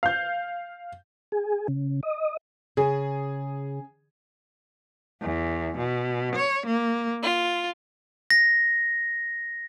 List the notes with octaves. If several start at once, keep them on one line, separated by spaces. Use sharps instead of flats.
F5 G6
G#4
C#3
D#5
C#3 G#4
E2
B2
C#5
A#3
F4
A#6